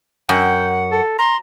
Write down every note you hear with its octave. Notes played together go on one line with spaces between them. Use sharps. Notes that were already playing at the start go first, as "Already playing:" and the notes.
F#2 F#5 G5
A4
A#5 C6